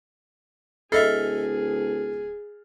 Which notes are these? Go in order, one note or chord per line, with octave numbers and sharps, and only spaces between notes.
D1 G#4 A4 D#5 E5 F6 A6 C7